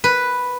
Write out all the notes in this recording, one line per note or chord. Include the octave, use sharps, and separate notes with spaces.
B4